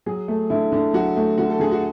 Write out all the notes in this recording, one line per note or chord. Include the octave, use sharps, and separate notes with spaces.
F#3 G#4
A3
D3 E4
D3
F#3 F#4
A3
D3 F#4
A4
D3 G#4
F#4